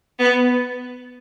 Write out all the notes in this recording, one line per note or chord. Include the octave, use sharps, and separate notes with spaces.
B3